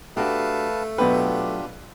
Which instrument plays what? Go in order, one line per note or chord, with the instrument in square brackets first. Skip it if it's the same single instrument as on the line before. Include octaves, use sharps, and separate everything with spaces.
[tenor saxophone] A3 [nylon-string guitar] D4 F#4 G4 [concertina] B4 F5 A5
[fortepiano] B2 B4 [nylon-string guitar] F#3 B3 G5 [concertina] D4 F4 G4